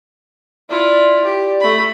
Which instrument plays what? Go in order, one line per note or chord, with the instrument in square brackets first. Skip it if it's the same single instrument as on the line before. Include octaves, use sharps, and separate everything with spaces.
[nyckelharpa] E4 F4 [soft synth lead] D5
[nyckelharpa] G4
A3 B5